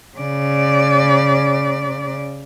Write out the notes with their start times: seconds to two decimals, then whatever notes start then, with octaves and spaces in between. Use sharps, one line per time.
0.18 C#3 D5